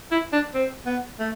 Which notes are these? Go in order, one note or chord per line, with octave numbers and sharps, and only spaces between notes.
E4
D4
C4
B3
A3